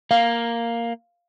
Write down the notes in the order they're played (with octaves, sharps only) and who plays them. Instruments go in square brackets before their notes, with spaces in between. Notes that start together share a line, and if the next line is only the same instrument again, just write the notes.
[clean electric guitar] A#3 [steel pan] F5